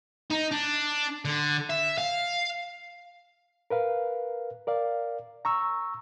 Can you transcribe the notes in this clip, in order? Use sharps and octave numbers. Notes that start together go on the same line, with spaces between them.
D#4
D4
D3
E5
F5
A#4 B4 F5
A#4 D5 F5
A#5 C#6 E6